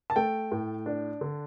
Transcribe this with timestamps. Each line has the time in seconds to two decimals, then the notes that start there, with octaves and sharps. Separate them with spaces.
0.10 A5
0.16 A3 G5
0.52 A2
0.86 D4
1.21 D3